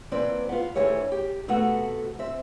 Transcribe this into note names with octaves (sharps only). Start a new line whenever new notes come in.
E3 A#3 C4 B4 D5
B3 F4
D2 D3 E3 G3 C#5 E5
G4
C3 A3 B3 F#4 A4 F#5
C4 E5